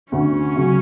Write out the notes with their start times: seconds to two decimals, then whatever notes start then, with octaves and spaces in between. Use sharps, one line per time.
0.12 D2 C#4
0.55 C#3 F#3